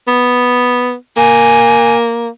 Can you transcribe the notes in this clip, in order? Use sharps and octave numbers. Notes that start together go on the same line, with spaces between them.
B3
A#3 G#5